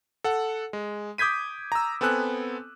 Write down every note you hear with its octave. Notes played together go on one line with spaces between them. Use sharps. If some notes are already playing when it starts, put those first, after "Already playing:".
A4 F#5
G#3
D6 D#6 G6 G#6 B6 D#7
A#5 E6
B3 C4 A4 G#5 F#6